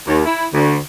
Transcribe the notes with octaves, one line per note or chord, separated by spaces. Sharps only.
D#2
E4
D2